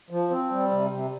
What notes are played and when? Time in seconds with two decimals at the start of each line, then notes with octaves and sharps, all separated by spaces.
0.10 F3
0.30 C4
0.51 G3
0.71 C3
0.91 C3